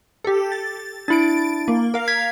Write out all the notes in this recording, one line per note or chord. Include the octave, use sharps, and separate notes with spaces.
G4 A4
A6
D4 E4 A6 D7
A#3
A#4 F5
G#6 B6